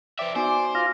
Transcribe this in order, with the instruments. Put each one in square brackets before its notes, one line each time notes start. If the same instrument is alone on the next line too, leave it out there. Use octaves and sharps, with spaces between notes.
[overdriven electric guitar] F3 E5 [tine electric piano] B4 C5 G5 [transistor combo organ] D5
[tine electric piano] B3 D#4 F#4 [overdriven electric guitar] C5 [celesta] G#5 D6
[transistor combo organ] F4 [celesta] A#6